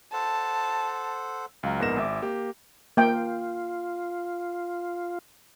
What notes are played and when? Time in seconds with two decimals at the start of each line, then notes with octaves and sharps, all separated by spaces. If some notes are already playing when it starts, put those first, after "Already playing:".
0.13 A4 C5 F#5 A5
1.63 C#2 F#3 F5 A#5
1.80 A#1 G#2 B3 A#4 A#6 E7
1.97 G#1 E5 D6
2.22 A#3 G4
2.97 A#3 F4 G5